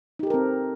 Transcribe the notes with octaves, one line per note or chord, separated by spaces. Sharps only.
C4 D#4 G4 A4 A#4